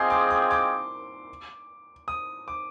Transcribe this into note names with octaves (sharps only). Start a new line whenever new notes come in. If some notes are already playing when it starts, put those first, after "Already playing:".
Already playing: C4 F4 G#4 D#5 G5 C6 D6
D6
D6
D6
D#6
D6